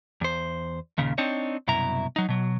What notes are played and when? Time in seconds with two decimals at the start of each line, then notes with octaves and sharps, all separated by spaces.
0.21 E2 C5
0.98 D#2 A#2 C#3
1.18 C4 D4 D#4 C#5
1.68 C2 F#2 B2 E4 A#5
2.16 F#3 D#4
2.29 B2 F#3